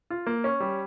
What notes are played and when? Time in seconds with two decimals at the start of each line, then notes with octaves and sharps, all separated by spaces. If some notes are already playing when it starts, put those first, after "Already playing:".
0.10 F4
0.26 A#3
0.44 C#4
0.60 G3